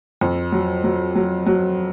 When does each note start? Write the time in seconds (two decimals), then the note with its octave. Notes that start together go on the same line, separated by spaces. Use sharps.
0.21 F2
0.52 F#3
0.84 F#3
1.15 F#3
1.46 F#3